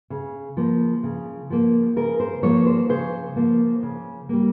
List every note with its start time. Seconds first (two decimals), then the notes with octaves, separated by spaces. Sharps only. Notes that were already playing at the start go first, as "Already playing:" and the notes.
0.10 C#3
0.57 F3 A#3
1.03 C#3
1.50 F3 A#3
1.96 C#3 A#4
2.20 C5
2.43 F3 A#3 C#5
2.66 C5
2.89 C#3 C5
3.36 F3 A#3
3.83 C#3
4.29 G3 A#3